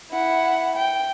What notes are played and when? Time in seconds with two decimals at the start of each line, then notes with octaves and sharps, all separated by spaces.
0.10 E4 F#5
0.76 G5